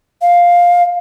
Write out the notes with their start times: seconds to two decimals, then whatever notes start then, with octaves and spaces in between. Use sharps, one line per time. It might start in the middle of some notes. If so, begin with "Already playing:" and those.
0.22 F5